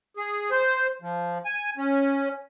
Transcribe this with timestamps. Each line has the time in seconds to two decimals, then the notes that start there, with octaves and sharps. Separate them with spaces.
0.17 G#4
0.51 C5
1.02 F3
1.45 G#5
1.77 C#4